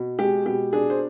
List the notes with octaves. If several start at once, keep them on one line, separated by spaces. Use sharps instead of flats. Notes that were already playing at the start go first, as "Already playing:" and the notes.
Already playing: B2
G#3 G4
B2 G4
D4 G#4
C5